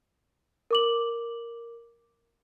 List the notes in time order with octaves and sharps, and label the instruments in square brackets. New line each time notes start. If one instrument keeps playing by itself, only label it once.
[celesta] A#4 D6 F#7